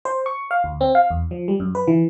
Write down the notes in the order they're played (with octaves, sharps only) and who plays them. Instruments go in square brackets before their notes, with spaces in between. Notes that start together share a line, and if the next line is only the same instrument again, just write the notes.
[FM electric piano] C5
C#6
F5
D2
C4
F5
E2
F3
G3
F#2
B4
E3